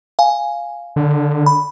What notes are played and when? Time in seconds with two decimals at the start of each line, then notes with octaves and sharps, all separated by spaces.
0.19 F5 G#5
0.96 D3
1.46 B5